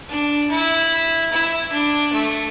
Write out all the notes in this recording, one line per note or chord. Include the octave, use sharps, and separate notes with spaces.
D4
E4
E4
D4
A3